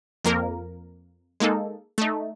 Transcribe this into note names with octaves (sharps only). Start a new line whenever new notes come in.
F2 A#3 A#4
G#3 A#3 D#4 A4
A3 D#4